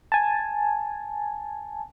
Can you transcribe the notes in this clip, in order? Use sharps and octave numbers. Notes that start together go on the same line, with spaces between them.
G#5 A5